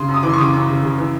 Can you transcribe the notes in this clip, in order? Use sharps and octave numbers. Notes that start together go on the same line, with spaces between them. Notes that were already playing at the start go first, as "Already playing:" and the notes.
Already playing: C#3 C6
F#2
D#6
E3 D6
C6
C#6
C#3 D6 D#6
F#2 D6
C#3
C#3
E3